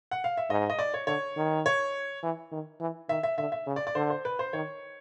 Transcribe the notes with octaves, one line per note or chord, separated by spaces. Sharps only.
F#5
F5
E5
G#2 D#5
D#5
D5
C#5
D3 C#5
D#3
C#5
E3
D#3
E3
D#3 E5
E5
D3 E5
E5
C#3
D5
D5
D3 C5
C5
B4
C5
D#3 C#5